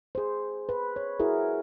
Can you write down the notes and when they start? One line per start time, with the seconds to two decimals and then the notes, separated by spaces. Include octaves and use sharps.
0.15 G#4 C5
0.69 B4
0.96 C#5
1.20 E4 F#4 G#4 A#4